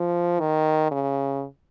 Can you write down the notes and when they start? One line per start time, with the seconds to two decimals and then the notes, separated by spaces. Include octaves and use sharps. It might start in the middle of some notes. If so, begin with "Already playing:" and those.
Already playing: F3
0.40 D#3
0.91 C#3